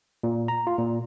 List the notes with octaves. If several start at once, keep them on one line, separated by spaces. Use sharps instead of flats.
A#2
A#5
F4
A#2